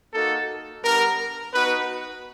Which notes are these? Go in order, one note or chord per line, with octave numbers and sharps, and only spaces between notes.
A#3 D#4 F#4 A4
G3 B3 D4 A#4
B3 D#4 F#4 B4